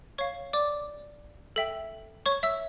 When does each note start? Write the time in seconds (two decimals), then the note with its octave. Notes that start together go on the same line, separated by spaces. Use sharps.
0.18 C#5 F5 C#6
0.53 D5 D6
1.56 A4 E5 G5
2.26 C#5 C#6
2.43 E5 E6